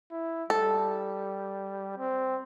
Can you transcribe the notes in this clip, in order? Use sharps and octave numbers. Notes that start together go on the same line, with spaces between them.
E4
G3 A4
C4